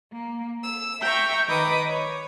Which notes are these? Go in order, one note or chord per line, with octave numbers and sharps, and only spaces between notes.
A#3
E6
E5 G5 A#5 C#6
D#3 B4 D#5 B5 D6 D#6
C#5